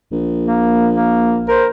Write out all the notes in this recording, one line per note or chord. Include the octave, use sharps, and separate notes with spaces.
A#1
A#3
A#3
A#4 C5